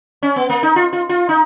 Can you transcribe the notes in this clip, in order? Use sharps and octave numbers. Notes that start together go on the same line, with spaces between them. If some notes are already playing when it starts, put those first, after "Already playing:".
C#4
B3
A#3
D#4
F4
F4
F4
D#4